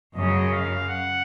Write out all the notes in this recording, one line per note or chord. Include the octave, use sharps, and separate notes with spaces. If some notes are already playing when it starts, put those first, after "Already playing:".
F#2 C#3 F#3 D#5
F5
F#5